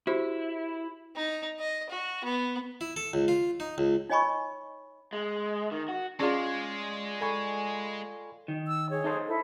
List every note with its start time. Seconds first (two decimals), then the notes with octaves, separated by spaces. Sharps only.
0.07 E4 F#4 G4 C5
1.16 D#4
1.59 D#5
1.89 F#4
2.24 B3
2.81 E4
2.96 A4
3.13 C#2
3.28 F4
3.60 D#4
3.78 C#2
4.10 D#4 C#5 D#5 G#5 B5 C#6
5.13 G#3
5.71 D#3
5.88 F#4
6.20 G#3 C#4 F4 G#4 C#5 D5 C#6
7.21 A4 G5 G#5 B5 C#6
8.48 D#3
8.68 E6
8.90 G#4 C#5
9.04 D#4 A4 C5
9.28 E4 A4